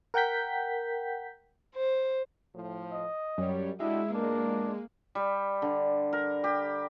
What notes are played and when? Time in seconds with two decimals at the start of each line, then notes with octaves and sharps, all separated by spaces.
0.14 A#4 F#5 G5 G6 B6
1.76 C5
2.55 A2 F3
2.92 D#5
3.38 F#2 G3 C#5
3.80 G#3 D4 E4 F#4 G4 E5
4.14 E2 A#2 A#3 D4 A#4
5.15 G3
5.62 D3
6.13 A#4
6.44 G4